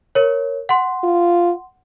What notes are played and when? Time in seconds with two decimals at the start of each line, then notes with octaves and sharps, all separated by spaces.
0.15 A#4 C#5
0.69 F#5 C6
1.03 F4